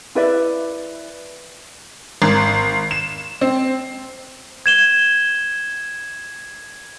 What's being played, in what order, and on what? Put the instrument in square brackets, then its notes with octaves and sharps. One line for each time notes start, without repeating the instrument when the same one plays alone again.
[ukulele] E4 B4 D5 E5
[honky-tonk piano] G#1
E7
C4
[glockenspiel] G#6 E7 G7